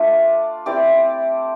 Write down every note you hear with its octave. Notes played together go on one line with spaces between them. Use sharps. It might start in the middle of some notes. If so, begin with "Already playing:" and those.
Already playing: A3 D4 F4
C4 E4 G4 D5